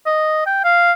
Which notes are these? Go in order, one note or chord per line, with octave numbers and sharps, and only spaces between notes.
D#5
G5
F5